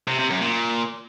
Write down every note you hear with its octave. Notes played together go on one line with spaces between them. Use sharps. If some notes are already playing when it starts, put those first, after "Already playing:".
C3
C3
F#2
A#2